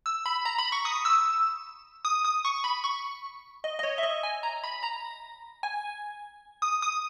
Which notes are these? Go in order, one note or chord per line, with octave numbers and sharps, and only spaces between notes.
E6
B5
A#5
B5
C#6
D#6
E6
D#6
D#6
C#6
B5
C#6
D#5
D#5
C#5
E5
D#5
G#5
A#5
B5
A#5
G#5
D#6
D#6